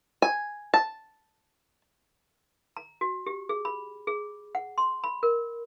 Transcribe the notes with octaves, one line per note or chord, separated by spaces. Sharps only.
G#5
A5
A#5
F#4
G4
G#4
B5
G#4
F#5
C6
B5
A#4